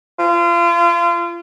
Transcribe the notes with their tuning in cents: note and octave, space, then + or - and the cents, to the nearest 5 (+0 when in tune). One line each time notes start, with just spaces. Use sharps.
F4 -35